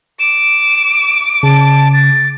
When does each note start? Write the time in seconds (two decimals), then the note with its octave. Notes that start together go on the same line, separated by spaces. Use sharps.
0.20 D6 E7
1.43 C#3 A5
1.93 A6